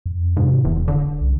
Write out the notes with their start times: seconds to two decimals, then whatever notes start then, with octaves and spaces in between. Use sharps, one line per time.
0.06 F2
0.37 G#2 C3
0.65 D1 E2
0.88 D3
1.21 C2